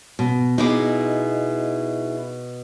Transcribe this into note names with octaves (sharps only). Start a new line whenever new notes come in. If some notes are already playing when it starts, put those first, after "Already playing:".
B2
B2 D#4 E4 G#4 D6